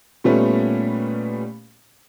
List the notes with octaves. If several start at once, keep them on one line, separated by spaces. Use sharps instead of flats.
A#2 G3 A3 B3 C#4